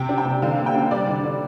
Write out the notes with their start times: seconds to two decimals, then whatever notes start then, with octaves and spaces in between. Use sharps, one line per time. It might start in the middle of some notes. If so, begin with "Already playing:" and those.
Already playing: C3 G5
0.09 D4
0.18 G5
0.25 C3
0.42 D3 F5
0.59 A#3
0.66 G5
0.75 D4
0.91 G3 D5
1.08 D3
1.24 D3